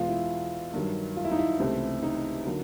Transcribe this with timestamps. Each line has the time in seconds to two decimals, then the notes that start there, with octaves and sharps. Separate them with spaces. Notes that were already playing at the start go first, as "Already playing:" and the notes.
Already playing: E2 B2 G#3 B3 F4
0.09 E4
0.73 G2 D#3 F#3
1.17 F4
1.25 E4
1.31 D#4
1.39 E4
1.60 C#2 C3 E3 A3 C4
2.03 D#4
2.45 D3 F#3 A#3